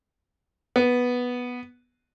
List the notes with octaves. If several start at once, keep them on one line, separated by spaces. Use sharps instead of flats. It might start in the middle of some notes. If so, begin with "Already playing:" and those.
B3